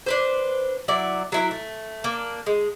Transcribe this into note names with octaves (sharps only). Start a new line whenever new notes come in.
D4 B4 C5
F#3 E4 D5
F#3 E4 A#4
A3
A#3 D4
G#3